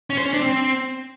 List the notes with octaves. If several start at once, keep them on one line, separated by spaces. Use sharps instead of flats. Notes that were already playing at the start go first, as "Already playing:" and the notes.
C#4
C5
C#4
D4
C4